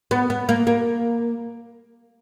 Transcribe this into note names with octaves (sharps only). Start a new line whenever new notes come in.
B3
B3
A#3
A#3